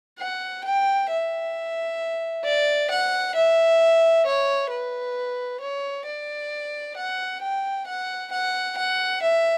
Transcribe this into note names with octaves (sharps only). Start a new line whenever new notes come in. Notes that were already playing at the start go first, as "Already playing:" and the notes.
F#5
G5
E5
D5
F#5
E5
C#5
B4
C#5
D5
F#5
G5
F#5
F#5
F#5
E5